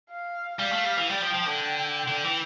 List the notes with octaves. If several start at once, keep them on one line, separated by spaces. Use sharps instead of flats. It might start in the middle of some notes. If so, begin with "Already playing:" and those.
F5
G3 F5
A3
G3
E3
G3 G5
F3
F3
D3
G5
D3
E3